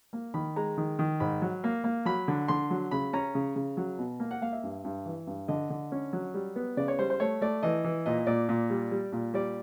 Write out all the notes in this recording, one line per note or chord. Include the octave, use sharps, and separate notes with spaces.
A#3
D#3 B5
G#3 A#5
D#3
D#3
G#2 B5
F#3
A#3
A#3
F#3 B5
D3
D3 C6
F#3
C#3 B5
C#4 A#5
C#3
C#3
F#3
B2
A#3
F#5
A#3 F5
E5
G2
G2
E3
G2
D3 D#5
D3
C#4
F#3
G3
B3
C#3 D5
C#5
G3 C5
C5
A3 C#5
A3 D5
E3 D#5
E3
A#2 D#5
A#2 D5
A#2
G3
G3
A#2
G3 D5